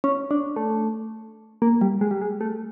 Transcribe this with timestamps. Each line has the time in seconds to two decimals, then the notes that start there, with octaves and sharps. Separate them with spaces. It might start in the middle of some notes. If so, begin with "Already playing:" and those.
0.04 C#4
0.31 D4
0.56 A3
1.62 A#3
1.81 G3
2.01 G#3
2.11 G3
2.21 G#3
2.41 A3